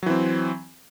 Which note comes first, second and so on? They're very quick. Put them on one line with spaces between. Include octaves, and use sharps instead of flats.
F#3 E3 C4